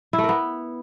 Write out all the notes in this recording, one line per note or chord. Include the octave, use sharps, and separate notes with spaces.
E4
A3
A#4
B3